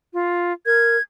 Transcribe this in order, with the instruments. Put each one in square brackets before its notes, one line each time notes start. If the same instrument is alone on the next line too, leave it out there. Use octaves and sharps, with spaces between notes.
[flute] F4
[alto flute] A#4 [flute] G#6